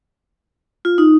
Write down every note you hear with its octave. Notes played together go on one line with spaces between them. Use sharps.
F4
D#4